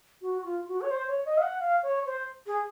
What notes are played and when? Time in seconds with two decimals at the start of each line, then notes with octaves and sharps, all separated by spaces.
0.21 F#4
0.44 F4
0.68 F#4
0.81 C#5
0.90 C5
1.08 C#5
1.25 D#5
1.37 F5
1.42 F#5
1.60 F5
1.83 C#5
2.06 C5
2.46 G#4